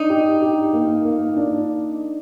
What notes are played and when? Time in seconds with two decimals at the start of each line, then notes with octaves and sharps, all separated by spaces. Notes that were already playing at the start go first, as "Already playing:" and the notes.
Already playing: D4 D#4
0.10 G4
0.42 G4
0.73 A#3
1.05 A#3
1.37 D4